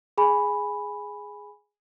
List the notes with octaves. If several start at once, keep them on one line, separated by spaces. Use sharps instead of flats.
G#4 G#5 B5